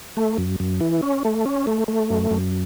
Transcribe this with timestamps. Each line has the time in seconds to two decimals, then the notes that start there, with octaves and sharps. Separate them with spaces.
0.17 A3
0.38 F#2
0.60 F#2
0.81 E3
1.02 C#4
1.25 A3
1.46 C#4
1.67 A3
1.88 A3
2.10 F#2
2.31 F#2